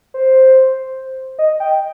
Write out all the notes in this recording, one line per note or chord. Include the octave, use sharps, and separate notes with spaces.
C5
D#5
G5